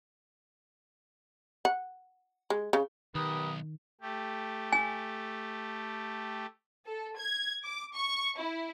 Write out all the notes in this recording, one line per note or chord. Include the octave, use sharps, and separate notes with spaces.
F#5
G#3
C#3
B1 D#3 G4 A#4 B4 D#6
A3 G4
G#5
A4
G#6
D6
C#6
E4